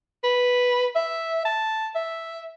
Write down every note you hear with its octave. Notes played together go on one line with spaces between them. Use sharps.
B4
E5
A5
E5